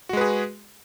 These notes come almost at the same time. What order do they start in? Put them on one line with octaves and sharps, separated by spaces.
F#4 G#3 B4 G#4